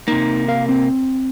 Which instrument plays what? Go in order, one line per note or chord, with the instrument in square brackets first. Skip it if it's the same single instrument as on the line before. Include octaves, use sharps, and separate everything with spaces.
[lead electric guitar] C3 A#3 [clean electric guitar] D#4
[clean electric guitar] A#4 F5
C4